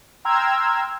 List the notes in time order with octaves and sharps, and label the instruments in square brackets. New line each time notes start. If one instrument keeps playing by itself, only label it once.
[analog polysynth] G5 A#5 C6 E6 F6 G#6